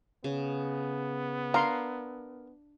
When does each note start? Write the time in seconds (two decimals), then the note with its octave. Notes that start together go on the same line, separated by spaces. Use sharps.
0.24 C#3 B3
1.54 D4 A#4 F5 C6